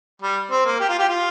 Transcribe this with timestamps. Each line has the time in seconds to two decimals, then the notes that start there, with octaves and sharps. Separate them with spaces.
0.22 G3
0.51 C4
0.66 A#3
0.80 G4
0.89 F4
0.99 G4
1.09 F4